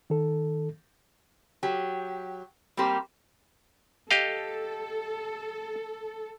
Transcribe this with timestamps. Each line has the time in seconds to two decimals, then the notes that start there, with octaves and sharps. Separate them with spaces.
0.10 D#3 A4
1.63 F#3 G4
2.77 G3 A#3 C4 G4 C5
4.11 G4 A4 D#5 F5